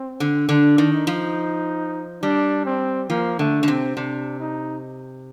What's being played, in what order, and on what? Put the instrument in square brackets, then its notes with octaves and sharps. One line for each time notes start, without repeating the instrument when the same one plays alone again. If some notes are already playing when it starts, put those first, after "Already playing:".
Already playing: [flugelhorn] C4
[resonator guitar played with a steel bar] D3
[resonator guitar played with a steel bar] D3 [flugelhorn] D4
[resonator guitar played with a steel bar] D#3
[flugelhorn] D#4
[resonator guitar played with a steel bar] F3
[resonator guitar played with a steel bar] G3 [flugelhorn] D4
[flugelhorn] C4
[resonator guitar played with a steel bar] F3 [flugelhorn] A#3
[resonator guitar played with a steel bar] D3 [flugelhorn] A3
[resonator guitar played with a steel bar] D3
[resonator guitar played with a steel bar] C3 [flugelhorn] C4
[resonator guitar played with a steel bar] C3 [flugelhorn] D4
[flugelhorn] D#4